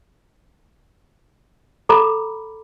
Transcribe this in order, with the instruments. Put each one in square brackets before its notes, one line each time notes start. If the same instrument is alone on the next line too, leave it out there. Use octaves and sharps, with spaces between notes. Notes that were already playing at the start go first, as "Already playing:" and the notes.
[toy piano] A4 A#5 B5 D6